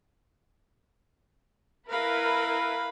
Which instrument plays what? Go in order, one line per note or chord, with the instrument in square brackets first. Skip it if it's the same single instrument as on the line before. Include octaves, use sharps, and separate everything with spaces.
[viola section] E4 A#4 B4 [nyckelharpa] F5 B5